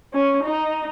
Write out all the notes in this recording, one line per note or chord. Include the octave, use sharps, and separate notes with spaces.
C#4
D#4